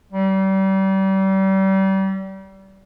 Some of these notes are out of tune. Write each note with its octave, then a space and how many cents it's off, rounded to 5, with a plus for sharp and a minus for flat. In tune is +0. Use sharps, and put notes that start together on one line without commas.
G3 -30